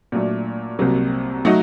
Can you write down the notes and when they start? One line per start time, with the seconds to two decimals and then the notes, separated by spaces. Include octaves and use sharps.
0.12 A#2 F#3 A3 D4
0.79 C2 C3 F#3 A#3
1.45 F#3 A3 D#4 F#4